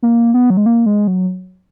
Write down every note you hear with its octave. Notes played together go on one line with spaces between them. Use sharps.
A#3
B3
F#3
G#3
A#3
G#3
F#3